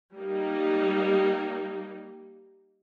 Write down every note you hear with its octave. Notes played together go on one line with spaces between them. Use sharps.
G3 A#3 D#4